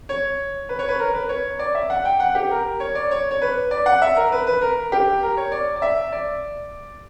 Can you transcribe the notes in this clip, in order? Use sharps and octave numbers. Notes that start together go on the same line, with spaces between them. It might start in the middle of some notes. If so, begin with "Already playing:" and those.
C#5
B4
C#5
B4
A#4
B4
C#5
D5
E5
F#5
G5
F#5
G4
A#4
C#5
D5
C#5
C#5
B4
D5
F#5
E5
A#4
B4
B4
A#4
G4
A#4
C#5
D5
D5
E5
D5